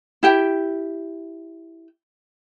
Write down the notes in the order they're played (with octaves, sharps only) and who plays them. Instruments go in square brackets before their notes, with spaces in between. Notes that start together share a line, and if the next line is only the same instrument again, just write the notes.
[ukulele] E4 G4 G5